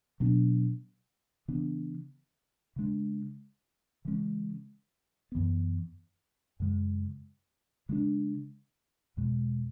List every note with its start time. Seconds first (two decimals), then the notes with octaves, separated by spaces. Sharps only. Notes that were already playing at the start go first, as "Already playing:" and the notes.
0.20 B2 F#3 B3 D4
1.48 C#3 E3 B3 D4
2.76 C#3 G#3 D4
4.05 C#3 E3 G#3 C#4
5.32 F#2 E3 B3
6.60 F#2 C#3 G#3
7.89 C#3 G#3 B3 D4
9.17 E2 B2 G#3